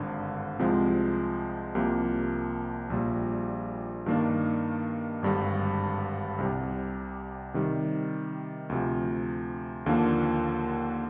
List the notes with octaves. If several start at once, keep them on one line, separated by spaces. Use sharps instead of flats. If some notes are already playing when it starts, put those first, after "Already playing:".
Already playing: G#1 G2 D3
C2 C3 F3 G#3 C4
C2 C3 F3 A#3
A#1 A#2 G3
G2 D#3 A#3 D4
G#1 G2 D3 G3
C2 C3 G3
C3 D#3 G3
D2 C3 F3
D#2 D3 F3 A#3 D4